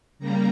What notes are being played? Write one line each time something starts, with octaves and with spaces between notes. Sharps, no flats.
C#3 G3 A#3 A#5